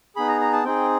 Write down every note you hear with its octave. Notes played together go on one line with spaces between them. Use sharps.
B3 D#4 G#4 B5
A#5
A#5
A5
C4 D#4 G#4 G5